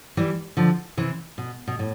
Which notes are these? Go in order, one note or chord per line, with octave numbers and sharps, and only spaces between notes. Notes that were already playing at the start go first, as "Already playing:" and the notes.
E3 G3
D3 F3
C3 E3
B2
B2
A2